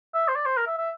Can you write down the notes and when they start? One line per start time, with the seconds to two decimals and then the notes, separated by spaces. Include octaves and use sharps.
0.14 E5
0.28 C5
0.35 D5
0.46 C5
0.57 A#4
0.67 E5
0.78 E5